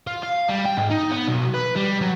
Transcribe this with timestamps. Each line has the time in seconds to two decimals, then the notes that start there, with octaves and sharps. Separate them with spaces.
0.07 F4
0.23 F5
0.49 G3
0.65 G5
0.77 G#2
0.91 D#4
1.11 B3
1.29 B1
1.54 B4
1.76 G3
2.02 F#3